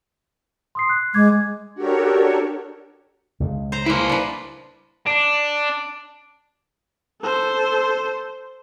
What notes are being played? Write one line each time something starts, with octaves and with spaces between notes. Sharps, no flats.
C6 D#6 C7
F#6
G#3 D6 G#6
D4 F#4 G4 A4 A#4 C#5
C#2 C#3
C5 A#5
A#3 E4 B4 C5
D4 B4
D4
A4 C5